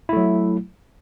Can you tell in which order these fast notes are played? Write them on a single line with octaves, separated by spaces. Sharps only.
E4 A3 F#3